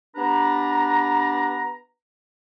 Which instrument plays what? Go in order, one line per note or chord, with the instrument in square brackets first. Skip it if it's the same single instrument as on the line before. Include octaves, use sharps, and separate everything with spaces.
[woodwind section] B3 D4 G4 B4 A#5